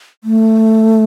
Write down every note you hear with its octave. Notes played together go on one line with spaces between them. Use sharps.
A3